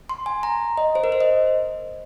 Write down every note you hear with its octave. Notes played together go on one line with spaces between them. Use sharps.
C6
G#5
A#5
D#5
C5
A#4
C5
D#5